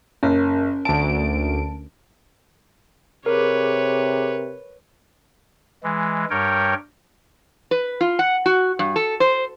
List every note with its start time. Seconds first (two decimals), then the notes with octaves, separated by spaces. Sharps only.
0.23 F#1 C#4 A#4
0.85 D2 A5 D7
3.26 C3 G#4 A#4 B4 C#5 D6
5.83 E3 G#3
6.30 G2 G3 A#4 C#5 G5
7.71 B4
8.01 F4
8.19 F#5
8.46 F#4
8.79 G2
8.96 A4
9.20 C5